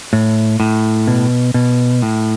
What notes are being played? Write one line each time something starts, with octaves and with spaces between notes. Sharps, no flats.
A2
A2
B2
B2
A2